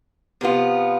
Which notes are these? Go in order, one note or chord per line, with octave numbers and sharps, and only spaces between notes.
C3 F3 B3 F4